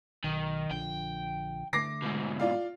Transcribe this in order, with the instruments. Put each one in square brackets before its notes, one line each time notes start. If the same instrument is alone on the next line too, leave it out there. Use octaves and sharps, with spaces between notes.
[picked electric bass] B1 [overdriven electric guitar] D#3
[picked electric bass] A#1 D3 F3 [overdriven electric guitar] G5
[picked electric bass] D3 A3 [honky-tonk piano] D6 A#6 C7
[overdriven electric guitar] G#2 B2
[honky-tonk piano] F4 D5 F5